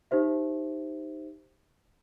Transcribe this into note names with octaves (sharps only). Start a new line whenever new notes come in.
D#4 G4 C5 E5